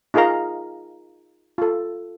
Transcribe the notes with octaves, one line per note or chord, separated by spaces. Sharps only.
D#4 F4 G#4 A#4 F5 A#5
F4 A4